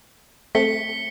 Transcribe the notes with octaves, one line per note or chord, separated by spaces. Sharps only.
A3 C4 A4 B6 C#7 G7